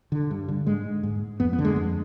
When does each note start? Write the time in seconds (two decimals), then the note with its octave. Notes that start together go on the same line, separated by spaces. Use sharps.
0.12 D3
0.31 G2
0.48 D3
0.67 G#2 G#3
1.03 G#2
1.40 F2 B3
1.53 B3
1.59 D3
1.65 G#3
1.76 F2